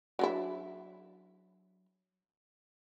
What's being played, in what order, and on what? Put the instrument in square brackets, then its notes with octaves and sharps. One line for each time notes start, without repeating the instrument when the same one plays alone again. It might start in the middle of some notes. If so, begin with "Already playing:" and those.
[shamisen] F#3 D4 E4